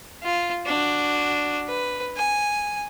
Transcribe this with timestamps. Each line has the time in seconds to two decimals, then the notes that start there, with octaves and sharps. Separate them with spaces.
0.23 F4
0.66 D4 F#4
1.68 B4
2.17 G#5